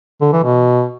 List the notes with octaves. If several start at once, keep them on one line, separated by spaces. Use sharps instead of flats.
D3
E3
B2